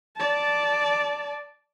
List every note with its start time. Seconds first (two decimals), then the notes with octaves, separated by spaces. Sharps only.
0.17 D5 A5